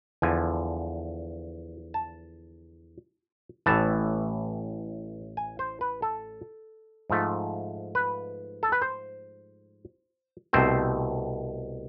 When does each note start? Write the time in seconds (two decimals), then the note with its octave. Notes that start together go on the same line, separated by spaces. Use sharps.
0.22 E2 D3 F3 G#5
1.94 A5
3.66 A1 A2 E3 A5
5.37 G#5
5.59 C5
5.81 B4
6.02 A4
7.10 G#2 F3 A3
7.95 B4
8.63 A4
8.72 B4
8.82 C5
10.53 C2 B2 A3 C4 C5